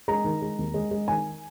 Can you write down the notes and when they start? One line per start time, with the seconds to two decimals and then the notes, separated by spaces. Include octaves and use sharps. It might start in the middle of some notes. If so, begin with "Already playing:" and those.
0.08 G#3 A#5
0.24 D#3
0.42 G#3
0.59 D#2
0.74 G#3
0.91 G#3
1.08 D#3 G#5